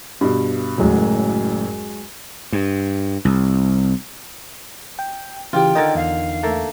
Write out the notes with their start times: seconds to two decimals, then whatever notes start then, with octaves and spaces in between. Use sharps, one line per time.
0.21 G2 B2
0.78 F#1 F#2 A2 F#3 G#3
2.52 G2
3.25 C2
4.99 G5
5.53 C#3 E3 F4 G4 G5
5.75 D3 D#3 D#5 A#5 A6
5.95 E2 F5
6.43 A3 A#3 A4